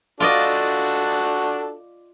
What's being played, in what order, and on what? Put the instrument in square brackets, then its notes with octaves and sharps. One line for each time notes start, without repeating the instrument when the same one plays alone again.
[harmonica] D4 F#4 A4 [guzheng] F4 D5 D#5